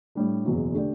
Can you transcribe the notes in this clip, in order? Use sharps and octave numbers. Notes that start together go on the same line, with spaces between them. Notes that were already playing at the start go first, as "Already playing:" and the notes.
A2 G3 D4
F#1 E2 B2 F#3
D3 A3 D4 G4 D5